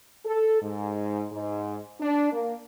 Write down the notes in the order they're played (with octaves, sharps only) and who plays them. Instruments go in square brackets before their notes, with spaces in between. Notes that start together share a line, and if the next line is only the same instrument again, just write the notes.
[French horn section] A4
G#2
G#2
D4
A#3